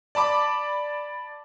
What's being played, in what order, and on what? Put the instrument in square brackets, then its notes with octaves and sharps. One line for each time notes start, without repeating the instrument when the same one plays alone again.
[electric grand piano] D5 A5 B5 D6